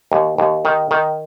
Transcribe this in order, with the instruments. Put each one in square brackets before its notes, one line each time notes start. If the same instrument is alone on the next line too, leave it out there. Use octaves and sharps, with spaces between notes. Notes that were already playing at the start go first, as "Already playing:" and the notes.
[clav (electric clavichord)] D#2
D#2
D#3
D#3